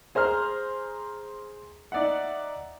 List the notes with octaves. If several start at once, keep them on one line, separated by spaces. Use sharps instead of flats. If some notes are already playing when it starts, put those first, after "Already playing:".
G#4 C5 A#5 F6
D#4 D5 E5 F#5